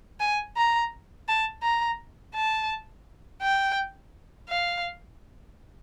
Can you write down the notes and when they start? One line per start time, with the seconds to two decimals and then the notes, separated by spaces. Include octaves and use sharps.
0.20 G#5
0.57 A#5
1.28 A5
1.63 A#5
2.35 A5
3.42 G5
4.49 F5